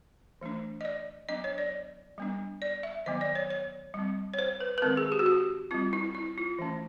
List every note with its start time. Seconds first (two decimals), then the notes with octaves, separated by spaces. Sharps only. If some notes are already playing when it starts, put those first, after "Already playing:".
0.41 E3 A3 D4
0.81 D#5
0.85 D5
1.29 F#3 B3 D4 D#5
1.44 C#5
1.58 D5
2.18 G3 B3 D4
2.62 D5
2.83 E5
3.06 D#3 F#3 B3 D#5
3.21 D5
3.35 C#5
3.50 C#5
3.94 G3 C4
4.34 C#5
4.39 C5
4.61 B4
4.78 B4
4.82 D#3 G#3 C4 A#4
4.97 G#4
5.12 G4
5.19 F#4
5.26 G4
5.71 G3 C4 F4
5.93 E4
6.15 E4
6.38 F4
6.59 E3 A3 C#4